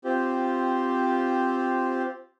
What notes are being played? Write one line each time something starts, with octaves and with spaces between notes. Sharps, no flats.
C4 F4 G4 C5